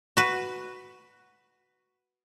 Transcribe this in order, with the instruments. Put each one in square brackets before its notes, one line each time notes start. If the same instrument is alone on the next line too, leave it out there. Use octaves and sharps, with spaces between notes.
[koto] F#4 B4